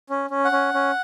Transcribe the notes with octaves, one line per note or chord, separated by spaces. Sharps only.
C#4
C#4
F#5
C#4
C#4